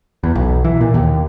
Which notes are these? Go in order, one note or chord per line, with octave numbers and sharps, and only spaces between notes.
E2
B1
E3
A#2
D#2